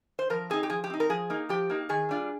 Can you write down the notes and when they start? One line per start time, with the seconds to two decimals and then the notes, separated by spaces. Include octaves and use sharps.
0.19 C5
0.30 F3 A#4
0.50 C4 D#4 G#4
0.63 G4
0.70 F3 G#4
0.84 G4
0.90 C4 D#4
1.00 A#4
1.10 F3 G#4
1.30 A#3 D#4
1.49 F3 G4
1.70 A#3 D#4
1.89 D#3 G#4
2.09 G3 D4 F4